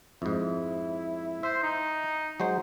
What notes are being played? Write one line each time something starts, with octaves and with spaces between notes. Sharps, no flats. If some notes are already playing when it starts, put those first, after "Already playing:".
F2 G#2 E4
C5 E5
D#4
F#3 G#3 C5